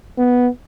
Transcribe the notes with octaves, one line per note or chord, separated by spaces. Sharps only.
B3